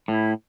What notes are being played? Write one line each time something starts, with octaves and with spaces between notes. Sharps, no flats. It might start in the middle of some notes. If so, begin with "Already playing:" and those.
A2 E4